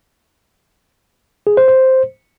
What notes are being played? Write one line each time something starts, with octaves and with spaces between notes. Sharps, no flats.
G#4
C5
C5